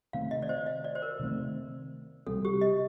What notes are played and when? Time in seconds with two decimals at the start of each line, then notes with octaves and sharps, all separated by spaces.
0.13 C3 D#3 A3 C4 F5
0.31 D#5
0.42 D5
0.49 C5
0.66 D#5
0.84 D5
0.95 C5
1.02 A#4
1.20 C3 D#3 A3 C4
2.27 C3 G3 C4 A4
2.45 G4
2.61 D#5